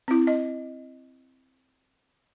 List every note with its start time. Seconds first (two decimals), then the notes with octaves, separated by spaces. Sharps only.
0.08 C4 E4
0.27 D#5